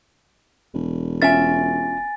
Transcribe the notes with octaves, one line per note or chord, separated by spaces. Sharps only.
E1
C#4 F4 E5 G#5 A6